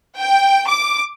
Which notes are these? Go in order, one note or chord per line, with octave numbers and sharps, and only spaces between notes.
G5
D6